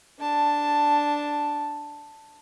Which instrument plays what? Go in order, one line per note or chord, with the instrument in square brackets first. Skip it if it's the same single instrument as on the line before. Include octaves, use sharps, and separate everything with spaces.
[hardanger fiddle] D4 A5